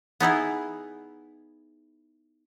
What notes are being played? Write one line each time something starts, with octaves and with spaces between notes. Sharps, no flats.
B3 D#4 E4 G#4